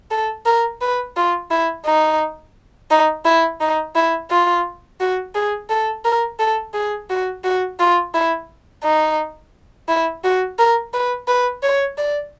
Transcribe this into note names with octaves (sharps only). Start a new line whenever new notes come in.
A4
A#4
B4
F4
E4
D#4
D#4
E4
D#4
E4
F4
F#4
G#4
A4
A#4
A4
G#4
F#4
F#4
F4
E4
D#4
E4
F#4
A#4
B4
B4
C#5
D5